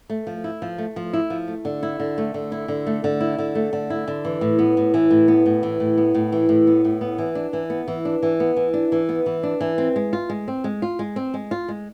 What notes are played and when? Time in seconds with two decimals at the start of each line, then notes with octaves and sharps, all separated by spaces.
0.10 A3
0.27 F3
0.44 E4
0.62 F3
0.78 A3
0.96 F3
1.13 E4
1.30 F3
1.48 A3
1.65 D3
1.83 E4
2.00 D3
2.18 A3
2.34 D3
2.52 E4
2.68 D3
2.86 A3
3.04 D3
3.20 E4
3.39 D3
3.55 A3
3.73 D3
3.90 E4
4.08 D3
4.25 E3
4.41 A2
4.59 B3
4.77 A2
4.94 E3
5.11 A2
5.28 B3
5.46 A2
5.63 E3
5.80 A2
5.98 B3
6.15 A2
6.32 E3
6.49 A2
6.67 B3
6.84 A2
7.01 B3
7.18 E3
7.35 D4
7.53 E3
7.70 B3
7.88 E3
8.05 D4
8.23 E3
8.40 B3
8.56 E3
8.74 D4
8.92 E3
9.09 B3
9.26 E3
9.43 D4
9.61 E3
9.78 C4
9.96 G#3
10.13 F4
10.30 G#3
10.48 C4
10.64 G#3
10.82 F4
10.99 G#3
11.16 C4
11.34 G#3
11.51 F4
11.68 G#3